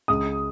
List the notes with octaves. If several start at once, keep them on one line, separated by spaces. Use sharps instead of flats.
C#2 D#6